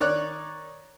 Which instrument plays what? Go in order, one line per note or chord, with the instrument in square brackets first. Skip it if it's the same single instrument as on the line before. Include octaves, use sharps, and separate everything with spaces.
[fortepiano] D#3 C#5 D5 F#6